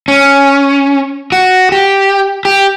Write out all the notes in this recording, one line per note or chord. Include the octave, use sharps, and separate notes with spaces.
C#4
F#4
G4
G4